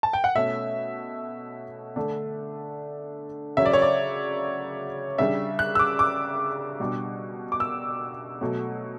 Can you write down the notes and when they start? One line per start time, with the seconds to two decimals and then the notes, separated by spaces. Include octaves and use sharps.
0.03 A5
0.13 G5
0.24 F#5
0.35 B2 A3 C#4 E5
1.96 D3 A3 D4
3.57 C#3 F#3 C#4 E5
3.66 D5
3.73 C#5
3.82 D5
5.18 C#3 G3 D4 E5
5.59 F#6
5.75 E6
5.79 D6
5.99 D6
6.80 B2 G3 D4
7.52 D6
7.60 E6
8.41 B2 F#3 A3